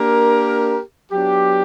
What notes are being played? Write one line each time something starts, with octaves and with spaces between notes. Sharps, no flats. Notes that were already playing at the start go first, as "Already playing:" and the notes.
Already playing: A#3 D4 G4 A#4
F#3 B3 D4 G4